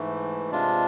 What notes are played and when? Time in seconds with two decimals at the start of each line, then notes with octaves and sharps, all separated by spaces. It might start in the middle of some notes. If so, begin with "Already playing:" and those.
Already playing: G#2 E3 A3
0.51 C3 G#3 D4 F4